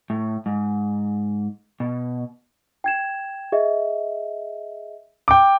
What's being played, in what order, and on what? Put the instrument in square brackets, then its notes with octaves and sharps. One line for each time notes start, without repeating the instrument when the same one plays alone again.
[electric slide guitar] A2
G#2
B2
[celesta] G5 G#6 E7
G#4 D#5 E5
[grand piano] G5 D6